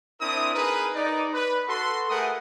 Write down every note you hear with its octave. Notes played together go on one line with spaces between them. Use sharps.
C4 D4 E4 A#4 D#6
D#4 G#4 A#4 B4
D#4 D5
B4
F#4 A4 C6
A3 G#4 A#4 B4 F#5 D#6